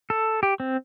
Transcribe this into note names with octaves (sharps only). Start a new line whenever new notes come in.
A4
G4
C4